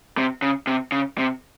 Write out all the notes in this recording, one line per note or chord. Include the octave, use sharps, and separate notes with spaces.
C3
C#3
C3
C#3
C3